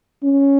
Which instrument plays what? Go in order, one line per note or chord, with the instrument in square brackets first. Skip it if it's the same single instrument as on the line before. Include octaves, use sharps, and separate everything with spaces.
[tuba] C#4